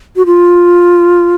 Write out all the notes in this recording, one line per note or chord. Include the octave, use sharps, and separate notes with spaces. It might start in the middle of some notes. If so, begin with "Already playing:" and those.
F#4
F4